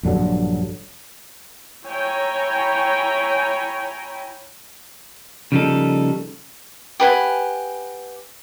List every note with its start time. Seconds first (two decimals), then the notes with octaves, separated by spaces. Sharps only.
0.03 A#1 G2 D3 F#3
1.85 E4 C#5 G5 G#5 A#5 B5
5.52 C#3 F3 G3 A#3 D#4 A4
7.00 G4 B4 F#5 G#5